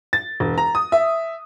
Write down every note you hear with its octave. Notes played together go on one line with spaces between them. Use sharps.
A6
E1
A#5
D#6
E5